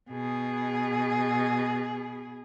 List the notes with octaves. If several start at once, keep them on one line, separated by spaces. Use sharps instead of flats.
B2 G#4